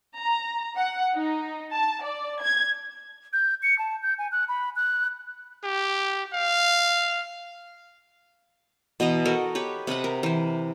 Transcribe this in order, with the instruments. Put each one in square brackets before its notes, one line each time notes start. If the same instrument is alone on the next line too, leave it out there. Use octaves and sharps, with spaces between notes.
[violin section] A#5
F#5
D#4
A5
D5
G#6
[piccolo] G6
C#7
A5
G6
G#5
F#6
B5
F#6
[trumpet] G4
F5
[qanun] B2 E3 D#5 A#5
F#4 A4 A#4 D#5
G4 B4 C#5
C3 B4 D#5 F#5
A#4
E3 C5